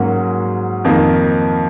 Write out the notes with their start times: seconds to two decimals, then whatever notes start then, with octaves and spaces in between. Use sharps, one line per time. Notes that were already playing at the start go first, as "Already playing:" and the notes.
Already playing: G#2 F#3 A#3 C#4 F#4
0.84 F2 D#3 A#3